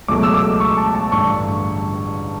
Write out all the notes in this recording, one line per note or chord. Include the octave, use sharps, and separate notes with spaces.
C#2 B2 F#3 A3 D6
E6
D6
C#6
A5
A5
A1 G2 D3 C#6